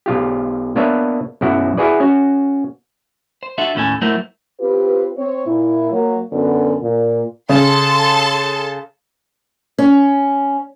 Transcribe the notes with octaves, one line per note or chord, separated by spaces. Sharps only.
B1 F4 G4
A#3 B3 D4 B4 C#5 E5
B1 F#2 E4 F#4 F#5
E4 F#4 G#4 B4 D5
C#4 F#4
C5
D4 F4 F#4 A4 E5
D#2 A2 C#4 A4 G#5
F#3 A3 E4 A#4 C5
C4 F4 G4 B4
C4 C#5
A#2 E4
F#3 A#3
F#2 D3 B3
A#2
C#3 A4 A5 C6
C#4